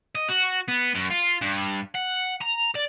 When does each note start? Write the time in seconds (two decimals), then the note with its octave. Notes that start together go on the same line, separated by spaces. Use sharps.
0.15 D#5
0.29 F#4
0.68 B3
0.95 F#2
1.11 F4
1.41 G2
1.95 F#5
2.41 A#5
2.75 D5